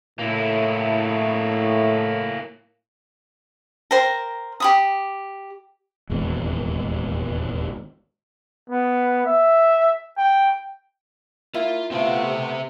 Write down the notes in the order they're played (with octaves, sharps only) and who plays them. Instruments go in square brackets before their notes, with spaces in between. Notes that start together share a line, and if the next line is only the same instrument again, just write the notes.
[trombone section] A2 [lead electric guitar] A#3 E4
[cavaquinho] A#4 C5 G5 A#5
G4 B5 D#6
[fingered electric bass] D#1 G#1 E2 G#3
[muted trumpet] B3
E5
G5
[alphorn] A#3 [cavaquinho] E4 [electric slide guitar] F4
[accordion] A3 B3 [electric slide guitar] C4 C5 E5 [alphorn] F4
[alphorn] C3